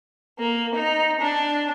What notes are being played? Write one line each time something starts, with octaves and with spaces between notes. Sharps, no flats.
A#3
D#4
D4